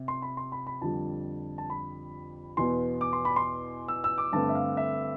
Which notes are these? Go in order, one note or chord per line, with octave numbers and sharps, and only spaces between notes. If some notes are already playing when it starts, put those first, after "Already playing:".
Already playing: C3
C6
B5
C6
B5
B5
F2 D3 G3 A5
A5
B5
E2 B2 B3 C6
D6
C6
B5
C6
E6
E6
D6
G2 D3 A3 C4 A5
E5
F5
E5